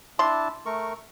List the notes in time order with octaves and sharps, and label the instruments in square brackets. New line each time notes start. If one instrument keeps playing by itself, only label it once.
[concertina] D4 E4 A5 [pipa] C6
[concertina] A3 A#4 C#6